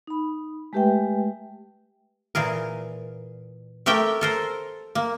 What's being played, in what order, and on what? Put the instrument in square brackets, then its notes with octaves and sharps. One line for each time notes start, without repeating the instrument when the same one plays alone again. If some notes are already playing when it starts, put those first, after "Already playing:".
[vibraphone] D#4 B5
G#3 A3 G4 B4 E5 G5
[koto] A#2 E3 G#4 A#4
A3 G4 A#4 E5 G5
A4 A#4 C5
A#3